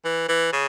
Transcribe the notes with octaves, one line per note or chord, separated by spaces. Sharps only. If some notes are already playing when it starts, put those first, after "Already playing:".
E3
E3
C#3